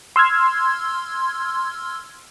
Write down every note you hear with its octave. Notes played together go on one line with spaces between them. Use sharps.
C6 E6 F6 G#6